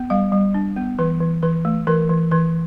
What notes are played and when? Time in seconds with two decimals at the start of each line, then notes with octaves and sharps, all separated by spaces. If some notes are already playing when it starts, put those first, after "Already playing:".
Already playing: B3
0.10 G3 F5
0.32 G3
0.54 D4
0.76 B3
0.99 E3 B4
1.21 E3
1.43 E3 B4
1.65 A3
1.87 E3 A#4
2.09 E3
2.31 E3 B4